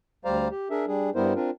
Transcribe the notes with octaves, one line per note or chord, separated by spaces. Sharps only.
D2 G3 C5 D5 F5 A#5
G4
D4 G#4 A#4 E5
G3 D4 G#4
G2 G3 B3 E4 A#4 C5
C4 D4 F4 A#4